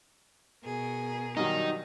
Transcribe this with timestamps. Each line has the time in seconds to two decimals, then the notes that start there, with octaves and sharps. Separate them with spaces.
0.64 B2 G#4 A#4
1.37 G2 D#3 F#3 D#4